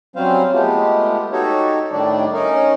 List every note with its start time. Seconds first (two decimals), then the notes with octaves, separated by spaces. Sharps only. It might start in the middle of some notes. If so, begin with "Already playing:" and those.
0.16 F#3 G3 C4 C#4 C5 F5
0.53 G#3 A3 B3 F4 G4
1.32 D#4 F#4 G4 A4 C#5
1.92 A2 D#3 G3 A3 D4 D5
2.33 C#4 D#4 A#4